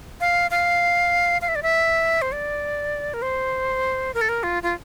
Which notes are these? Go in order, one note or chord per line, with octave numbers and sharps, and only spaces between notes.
F5
F5
F5
E5
D5
E5
C5
D5
A#4
C5
A#4
A4
A#4
F4
F4